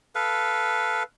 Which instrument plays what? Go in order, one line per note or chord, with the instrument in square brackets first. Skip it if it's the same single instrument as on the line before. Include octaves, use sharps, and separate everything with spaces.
[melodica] A4 B4 F5